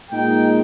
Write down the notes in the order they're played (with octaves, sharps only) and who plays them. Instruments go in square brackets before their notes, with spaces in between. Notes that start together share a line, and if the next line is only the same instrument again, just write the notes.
[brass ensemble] A#2 G#3 D#4 G5